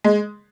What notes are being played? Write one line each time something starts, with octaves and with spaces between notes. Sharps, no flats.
G#3